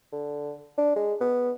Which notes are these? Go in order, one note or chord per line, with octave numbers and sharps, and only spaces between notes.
D3
D4
G#3
B3